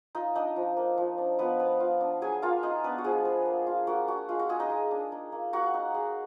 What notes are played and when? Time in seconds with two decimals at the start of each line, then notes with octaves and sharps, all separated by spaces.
0.15 D#4 F4 D#5
0.35 D4 D#4 D#5
0.56 F3
0.77 A#3
0.98 F3
1.18 D4
1.39 F3 B3 B4
1.60 B3
1.80 F4
2.01 D4
2.21 F#3 G#4 G#5
2.42 A#3 F4 F5
2.63 D#4 F4 D#5
2.84 B3 D4 B4
2.98 F#4
3.04 F3 G#3 G#4
3.25 G#3
3.46 A#3
3.67 F4
3.87 A#3 F#4
4.08 D4 F#4
4.29 G#3 F4
4.39 F#4
4.49 G#3 F4 G#4
4.60 D#4 D#5
4.70 G#3
4.91 D4
5.12 D#4
5.32 A#3
5.53 A#3 F#4 F#5
5.74 D#4
5.94 G#3